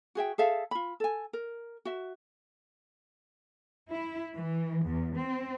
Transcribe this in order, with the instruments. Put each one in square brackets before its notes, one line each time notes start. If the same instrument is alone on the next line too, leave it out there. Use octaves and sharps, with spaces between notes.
[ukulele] F#4 G#4 E5 G5
G#4 A4 E5 F5
F4 B5
A4 G#5
A#4
F#4 E5
[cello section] E4
E3
E2
C4